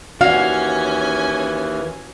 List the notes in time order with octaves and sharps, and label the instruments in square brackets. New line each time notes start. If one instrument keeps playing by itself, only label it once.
[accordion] D#2 E3 [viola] C#4 G#5 [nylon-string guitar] F#4 [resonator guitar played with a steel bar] F5